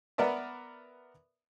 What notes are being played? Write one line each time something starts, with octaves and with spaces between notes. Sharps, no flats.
B3 A#4 B4 D5 E5